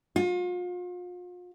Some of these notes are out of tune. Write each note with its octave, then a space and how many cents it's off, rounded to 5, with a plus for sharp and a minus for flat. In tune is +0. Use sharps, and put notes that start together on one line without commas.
F4 +40